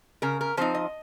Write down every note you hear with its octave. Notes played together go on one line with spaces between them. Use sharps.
C#3 A#4
A#4
F3 C4 D#4 C5
D#5